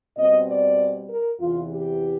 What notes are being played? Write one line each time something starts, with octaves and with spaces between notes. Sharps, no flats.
B2 G3 C4 D#5
D5
A#4
E2 C3 E3 F4
G4